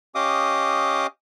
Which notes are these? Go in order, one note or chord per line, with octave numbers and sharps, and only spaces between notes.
C#4 G4 D#5 F5 D6 D#6